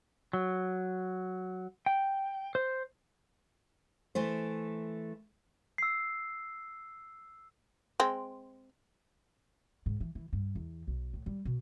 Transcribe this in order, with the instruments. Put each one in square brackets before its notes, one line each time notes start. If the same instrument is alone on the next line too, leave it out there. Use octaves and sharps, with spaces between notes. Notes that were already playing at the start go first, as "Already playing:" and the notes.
[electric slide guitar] F#3
G5
C5
[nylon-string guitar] E3 A3 C5
[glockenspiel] E6 C7
[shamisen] G#3 C4
[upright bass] G#2
E3
E3
G2
E2
B1
A2
G3
B2